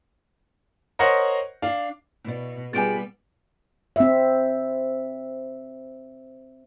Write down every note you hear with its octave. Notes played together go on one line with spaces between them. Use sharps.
A#4 C5 C#5 D#5 F#5
D4 F5
B2 E4 D5
G3 B3 F4 G4 G#4 G#5 A6 D7
C4 E5